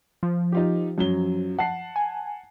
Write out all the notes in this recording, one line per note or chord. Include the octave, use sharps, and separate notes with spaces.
F3
D#4 F4 G4
F#2 F#3 G7
F#5 A5 C7
G#5